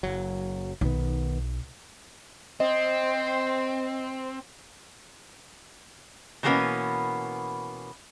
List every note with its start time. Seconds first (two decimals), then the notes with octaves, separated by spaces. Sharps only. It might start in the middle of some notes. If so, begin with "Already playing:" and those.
0.03 F#1 F#3
0.81 B1 D#3 B3
2.60 C4 C5 D#5
6.43 B2 E3 G3 A#3 B3 C#4